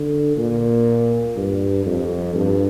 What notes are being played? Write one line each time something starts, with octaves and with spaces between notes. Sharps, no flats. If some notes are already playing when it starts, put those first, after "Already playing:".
Already playing: D3
A#2
G2
F2
G2